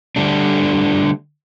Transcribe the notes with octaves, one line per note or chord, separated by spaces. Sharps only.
D3 G3 A3 D4